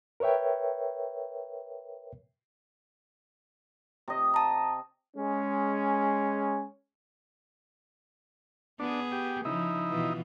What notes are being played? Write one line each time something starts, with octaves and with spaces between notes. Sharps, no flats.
A#4 B4 C#5 E5 G5
C3 D#5
A5 A#5
G#3 C#4
B3 D4 G#4
G4
C#3 F3 D#4 E4
B2 E3 F4